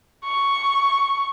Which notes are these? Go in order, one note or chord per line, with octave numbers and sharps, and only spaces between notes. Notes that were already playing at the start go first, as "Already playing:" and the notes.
C#6